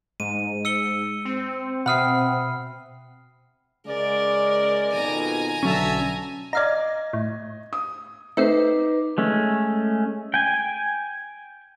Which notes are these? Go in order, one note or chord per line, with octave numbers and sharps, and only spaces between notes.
G#2 G#3 D#7
E6 C#7 G7
C4
B2 E5 F#5 G5 B5 D#6 F6 C7
C#3 G#3 A#4 D5
F2 B2 D#3 G#5 A#5
B1 D3 F#3 C#4 E5 A5
D5 D#5 F5 A#5 G#6
A2
D#6
A3 C4 D#4 B4 D6 C7
G#3 A3 C#4
G5 G#5